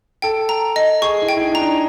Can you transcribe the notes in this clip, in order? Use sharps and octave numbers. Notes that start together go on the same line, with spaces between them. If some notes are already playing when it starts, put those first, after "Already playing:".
A4 G5
A#5
D#5
G#4 C#6
E4
G5
E4
D#4
D4 A#5
D#4